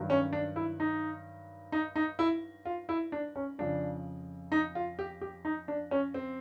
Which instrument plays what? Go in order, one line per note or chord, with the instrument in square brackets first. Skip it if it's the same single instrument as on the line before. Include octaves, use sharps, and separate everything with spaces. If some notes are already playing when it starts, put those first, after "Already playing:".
Already playing: [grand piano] G2 D#3 F#3
C#4
D4
E4
D#4
D#4
D#4
E4
F4
E4
D4
C#4
F2 C#3 F3 D4
D#4
F4
G4
G4
D#4
D4
C#4
C4